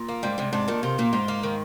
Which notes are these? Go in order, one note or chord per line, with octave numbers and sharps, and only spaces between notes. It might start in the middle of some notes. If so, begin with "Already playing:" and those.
Already playing: A#2
A#3
G#2 G3
G#2 C3
G#2 D4
A#2 D#3
C3 F4
A#2 A#3
G#2 F4
A#3
D#3